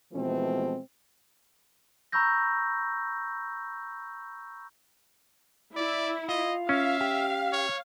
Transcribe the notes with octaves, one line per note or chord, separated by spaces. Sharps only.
B2 E3 F3 G#3 A3 C4
A#5 B5 C#6 E6 G6 A#6
E4 D5
F4 D#5
C#4 E5 F5
G4
C#5